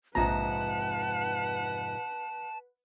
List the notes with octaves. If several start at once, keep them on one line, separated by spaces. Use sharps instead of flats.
A#1 F2 G#2 C3 B4 F#5 A5 A#5